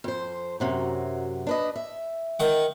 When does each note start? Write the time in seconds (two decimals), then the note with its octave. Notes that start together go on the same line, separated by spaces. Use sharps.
0.04 F2 C5
0.60 F#2 C3 F#3
1.47 D4 B4 D#5
1.76 E5
2.40 D#3 F#5